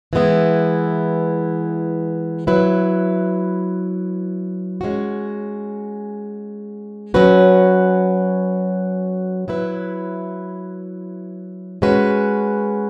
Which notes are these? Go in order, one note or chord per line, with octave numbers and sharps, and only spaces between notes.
E3 G#3 B3 E4
F#3 E4 B4
G#3 C#4 F#4
F#3 C#4 F#4 B4
F#3 E4 B4
G#3 C#4 F#4 B4